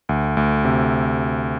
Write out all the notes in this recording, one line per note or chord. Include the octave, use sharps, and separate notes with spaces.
D2
D2
C3